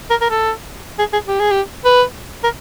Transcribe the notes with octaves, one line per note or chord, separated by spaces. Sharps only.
A#4
A#4
A4
G#4
G#4
G4
G#4
G4
B4
A#4